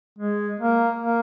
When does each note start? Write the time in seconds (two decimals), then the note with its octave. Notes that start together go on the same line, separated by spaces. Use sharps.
0.19 G#3
0.60 A#3
1.02 A#3